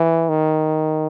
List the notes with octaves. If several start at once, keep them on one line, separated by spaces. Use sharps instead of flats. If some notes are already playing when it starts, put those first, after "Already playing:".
Already playing: E3
D#3